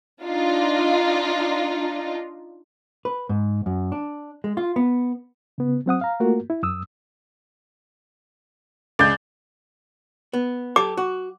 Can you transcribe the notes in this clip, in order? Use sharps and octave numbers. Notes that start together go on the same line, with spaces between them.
D4 D#4 F4
B4
G#2
F#2
D4
G#3
F4
B3
C#3 B3
F#3 C4 F#5 D#6
F5 A#5
A3 A#3 F4 F#4 A#4
E4
F#2 D#6 E6
C#2 D5 G6
B3
G4 A4 D6
F#4